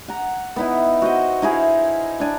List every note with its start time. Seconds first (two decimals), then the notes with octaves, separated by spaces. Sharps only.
0.08 F#5 A#5
0.56 B3 D#4 E4
1.02 F#4 C5 D#5
1.42 D#4 E4 G#4 F5
2.20 D4 G#5